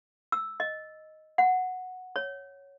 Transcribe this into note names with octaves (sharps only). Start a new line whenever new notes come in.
E6
D#5
F#5
C#5